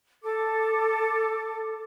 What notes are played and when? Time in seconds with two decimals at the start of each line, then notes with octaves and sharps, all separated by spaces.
0.23 A4 D6